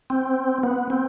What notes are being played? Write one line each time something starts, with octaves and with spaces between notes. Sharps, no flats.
C4
B3
C4